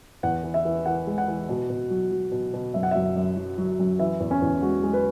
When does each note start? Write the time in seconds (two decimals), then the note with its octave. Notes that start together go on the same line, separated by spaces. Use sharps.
0.23 E2 F#5
0.43 E3
0.54 E5
0.65 E3
0.86 E3 F#5
1.07 G#3
1.18 F#5
1.28 E3
1.49 B2
1.70 B2
1.90 F#3
2.12 F#3
2.32 B2
2.54 B2
2.74 F#2 E5
2.83 F#5
2.91 F#2 E5
3.16 F#2
3.36 F#3
3.58 F#3
3.79 F#2
3.99 E3 E5
4.20 E2
4.31 C#4
4.42 E2
4.62 G#3 F#4
4.83 G#3
4.93 B4